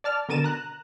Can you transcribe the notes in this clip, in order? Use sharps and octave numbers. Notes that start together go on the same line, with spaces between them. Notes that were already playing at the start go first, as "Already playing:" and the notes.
D5 A5 F6
B2 D3 A#4 A6 D#7 E7
A#5 F#6